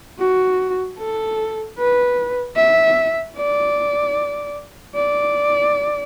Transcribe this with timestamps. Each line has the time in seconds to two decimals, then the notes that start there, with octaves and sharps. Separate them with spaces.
0.18 F#4
0.98 A4
1.78 B4
2.56 E5
3.37 D5
4.95 D5